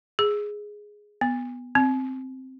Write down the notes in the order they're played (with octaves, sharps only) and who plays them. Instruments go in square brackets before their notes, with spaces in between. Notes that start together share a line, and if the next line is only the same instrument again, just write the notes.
[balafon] G#4
B3
C4